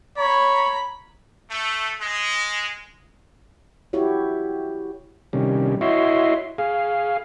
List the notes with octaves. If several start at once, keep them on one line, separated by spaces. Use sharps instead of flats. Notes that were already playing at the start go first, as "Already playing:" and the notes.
C#5 A#5 B5
A3
G#3
E4 F#4 G4 C#5
C3 D#3 G3 C#4
E4 F#4 C#5 D#5 E5 C6
G#4 F5